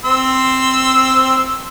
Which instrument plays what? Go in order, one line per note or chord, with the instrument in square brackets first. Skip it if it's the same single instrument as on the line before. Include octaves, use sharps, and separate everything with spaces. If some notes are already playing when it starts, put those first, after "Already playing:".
[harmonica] C4 C6 E6